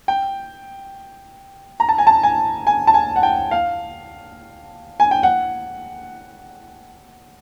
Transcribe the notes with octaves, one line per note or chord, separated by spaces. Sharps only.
G5
A#5
A5
G#5
A5
G#5
G#5
A5
G#5
F#5
G5
F5
G#5
G5
F#5